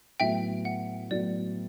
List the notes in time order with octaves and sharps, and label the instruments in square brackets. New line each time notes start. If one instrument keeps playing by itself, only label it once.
[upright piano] A2 F#3 B3 F#4 [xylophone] E5 G5
[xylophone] F#5
[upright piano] A2 F#3 B3 F#4 [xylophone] D5